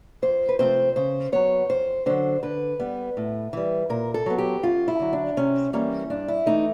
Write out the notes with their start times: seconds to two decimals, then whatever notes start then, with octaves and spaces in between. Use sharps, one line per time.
0.22 F2 C5
0.49 B4
0.59 C3 F3 A3 C4 C5
0.96 C#3 C5
1.32 F#3 B3 C#5
1.69 F2 C5
2.06 D3 F#3 C5
2.43 D3 B4
2.80 G3 B3
3.17 A2
3.53 E3 G3
3.90 A#2 A#4
4.14 A4
4.26 F#3 B3
4.38 G4
4.63 F#2 F4
4.88 E4
5.00 D3 F#3
5.13 D4
5.37 C3 C#4
5.73 E3 G3 A#3 C#4
6.10 G2 D4
6.28 E4
6.46 E3 A3 D#4